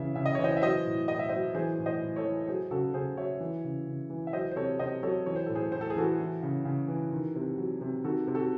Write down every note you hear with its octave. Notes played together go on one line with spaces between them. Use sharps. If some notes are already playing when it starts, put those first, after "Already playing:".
Already playing: C#3 E3 E5
C#3 E5
D#5
E3 C#5
C5 D#5
E5
F#3 C5 D#5
A2
A2 D#5
E5
F#3 C5 D#5
E3 G#4 C5
A2
C5 D#5
A2
A4 C#5
E3
F#3 G#4 C5
C#3 F#4 A4
C#3 G#4 C5
F#3 C#5 E5
E3
C#3
C#3
E3
E5
F#3 C5 D#5
C5
C3 A4 C#5
C3 C5 D#5
F#3 A4 C#5
E3 C#5
C5
A2 A4
G#4 C5
A2 C5
A4
G#4
E3 F#4 A4
E3
C#3
C#3
E3
D#3
C3
F#3
C3
D#3 F#4 A4
C3
F#4 A4